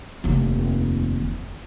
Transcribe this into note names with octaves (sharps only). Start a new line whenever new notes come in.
F1 D#2